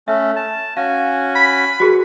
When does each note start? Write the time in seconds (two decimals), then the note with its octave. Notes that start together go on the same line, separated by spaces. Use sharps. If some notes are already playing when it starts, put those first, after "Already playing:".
0.08 A3 C#4 E5
0.36 A5
0.77 C#4 F#4 F5 G#5
1.35 B5
1.80 F#4 G#4 A#4 B4